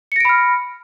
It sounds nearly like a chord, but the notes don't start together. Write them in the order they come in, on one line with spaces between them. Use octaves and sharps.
C#7 A#6 D7 B5 F6